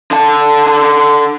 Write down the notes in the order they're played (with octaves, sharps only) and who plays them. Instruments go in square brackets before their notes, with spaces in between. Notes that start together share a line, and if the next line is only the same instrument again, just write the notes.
[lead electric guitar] D3 A5